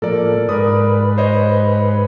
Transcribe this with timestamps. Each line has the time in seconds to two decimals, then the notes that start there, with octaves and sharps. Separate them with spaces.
0.02 A2 F3 A#3 A4 A#4 D5
0.49 G#2 A#4 B4 D5 D#6
1.18 C5 C#5 D#5